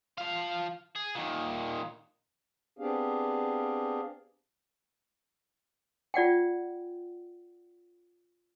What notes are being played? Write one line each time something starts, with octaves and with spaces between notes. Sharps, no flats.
F3 F5
G#4
A#2 D#3
B3 C4 D4 G4 G#4 F5
F4 D5 F#5 G5